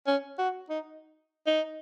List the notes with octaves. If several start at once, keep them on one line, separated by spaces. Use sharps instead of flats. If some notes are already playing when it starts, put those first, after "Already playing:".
C#4
F#4
D#4
D#4